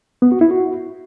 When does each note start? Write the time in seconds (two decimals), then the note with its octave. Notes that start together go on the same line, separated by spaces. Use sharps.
0.22 B3
0.32 F#4
0.41 E4
0.51 F#4